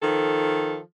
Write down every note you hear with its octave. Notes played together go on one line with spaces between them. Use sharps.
D#3 F3 A4